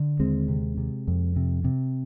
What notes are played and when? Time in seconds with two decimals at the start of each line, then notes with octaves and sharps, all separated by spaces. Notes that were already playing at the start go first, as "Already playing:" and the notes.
Already playing: D3
0.20 D#2 G#3 C4
0.48 C3
0.78 C3
1.08 F2
1.36 C3
1.64 C3